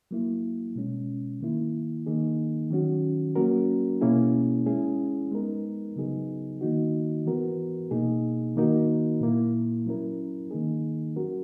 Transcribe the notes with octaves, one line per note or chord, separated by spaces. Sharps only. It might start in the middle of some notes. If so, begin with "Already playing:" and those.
F#3 A#3 E4
B2 G#3 C#4
D#3 A#3 E4
D#3 A#3 D#4 G#4
D#3 F#3 C#4 F#4
F#3 A#3 C#4 F#4 A#4
B2 A#3 C#4 E4 G#4
G#3 C#4 E4 G#4
G#3 B3 D#4 A#4
C#3 F#3 B3 D#4 G#4
D#3 A#3 D#4 F#4
E3 B3 F#4 A#4
B2 A#3 D#4 G#4
D#3 A#3 D#4 F#4 A#4
A#2 A#3 E4
F#3 C#4 E4 A#4
D#3 A#3 D#4 G#4
F#3 C#4 F#4 A#4